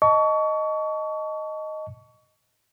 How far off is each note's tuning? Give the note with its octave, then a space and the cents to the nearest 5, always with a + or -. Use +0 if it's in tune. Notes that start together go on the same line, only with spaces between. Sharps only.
D#5 +0 A5 +0 C#6 +30